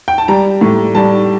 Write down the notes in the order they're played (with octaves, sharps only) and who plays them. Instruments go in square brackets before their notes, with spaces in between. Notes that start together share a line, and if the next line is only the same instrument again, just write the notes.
[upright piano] G5
A5
G3 A#5
A2
G3 A5